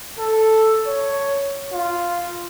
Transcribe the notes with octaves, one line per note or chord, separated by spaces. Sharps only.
A4
C#5
F4